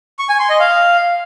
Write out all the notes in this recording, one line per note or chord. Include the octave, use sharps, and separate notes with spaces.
C#6
G#5
C6
D#5
F5